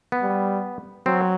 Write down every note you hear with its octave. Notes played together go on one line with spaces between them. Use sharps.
B3
G3
F#3 C4